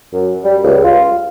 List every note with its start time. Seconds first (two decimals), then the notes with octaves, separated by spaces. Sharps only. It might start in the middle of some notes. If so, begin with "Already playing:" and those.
0.13 F#2
0.44 G3
0.64 C#2
0.84 F4